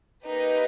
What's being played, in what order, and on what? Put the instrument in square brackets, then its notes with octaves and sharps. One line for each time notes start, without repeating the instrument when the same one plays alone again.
[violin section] A#3 D#4 G4 B4